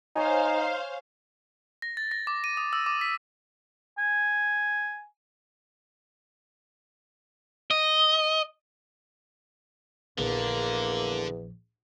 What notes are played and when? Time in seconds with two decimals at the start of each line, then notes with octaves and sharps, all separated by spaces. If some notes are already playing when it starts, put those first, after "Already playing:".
0.16 D#4 C5 C#5 F5 G#5
1.82 A#6
1.97 A6
2.11 A#6
2.27 D6
2.44 D#7
2.57 D#6
2.73 E6
2.86 D6
3.01 B6
3.98 G#5
7.71 D#5
10.18 A#1 E2 D3 A#3